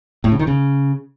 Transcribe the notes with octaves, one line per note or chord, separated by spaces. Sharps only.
A2
C#3
D#3
C#3